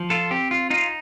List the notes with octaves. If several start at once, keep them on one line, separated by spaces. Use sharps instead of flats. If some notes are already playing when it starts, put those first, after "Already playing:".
Already playing: F3
F4 A4
C4 G4
F4
D#4 F4